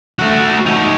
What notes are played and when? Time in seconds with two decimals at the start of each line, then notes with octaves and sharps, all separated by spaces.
0.19 A3 F#4
0.66 D#4 C#5